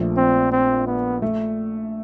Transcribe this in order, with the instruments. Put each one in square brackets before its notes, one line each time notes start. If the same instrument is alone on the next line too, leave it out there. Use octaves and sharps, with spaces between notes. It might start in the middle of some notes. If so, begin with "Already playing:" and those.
Already playing: [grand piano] A#1 A#2 F3 A3
[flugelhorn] C4
C4
B3
[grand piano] A3